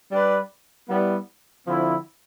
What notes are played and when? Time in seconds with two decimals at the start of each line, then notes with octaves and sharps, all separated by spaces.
0.11 G3 D4 G4 B4 D5
0.89 G3 B3 E4
1.67 D3 F3 C4 E4